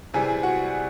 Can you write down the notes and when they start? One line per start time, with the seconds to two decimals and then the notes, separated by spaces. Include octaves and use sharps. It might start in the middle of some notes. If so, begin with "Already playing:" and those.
0.14 C3 E3 G3 G#4 G#5
0.43 F#4 F#5